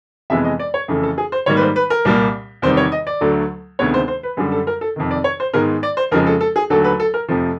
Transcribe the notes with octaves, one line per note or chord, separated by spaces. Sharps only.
F2 C3 E3 G#3 B3 E5
D#5
D5
C#5
F2 C#3 E3 A3
A4
G#4
C5
G#2 D#3 G3 A#3 C#5
B4
C5
B4
A#4
C2 A#2 G3 A#3
E2 C3 D#3 G3 C5
C#5
D#5
D5
D2 D3 F#3 A3
D2 C3 D#3 G#3 B3 C#5
C5
C5
B4
F#2 D3 G3 G#4
A4
A#4
A4
F2 C3 D#3
D5
C#5
C5
G#2 D#3 G#3 B3 A#4
D5
C5
F2 C#3 F3 G#3 A#4
A4
A4
G#4
D#2 D3 F#3 A3 A4
B4
A4
A#4
F2 C3 F3 A3